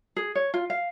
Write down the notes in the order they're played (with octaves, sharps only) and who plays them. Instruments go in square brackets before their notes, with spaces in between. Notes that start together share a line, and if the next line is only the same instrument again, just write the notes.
[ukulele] G#4
C#5
F4
F5